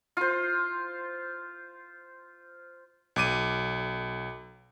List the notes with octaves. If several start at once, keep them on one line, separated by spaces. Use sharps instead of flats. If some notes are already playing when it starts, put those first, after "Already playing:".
F4 C5
B1 D6 D#7